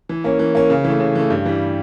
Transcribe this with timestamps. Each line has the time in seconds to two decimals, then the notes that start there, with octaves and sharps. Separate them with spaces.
0.09 E3
0.24 A#3 C#4
0.39 E3
0.55 A#3 C#4
0.70 C#3
0.85 E3
0.90 A3
1.00 C#3
1.15 E3 A3
1.30 G2
1.45 E3 G3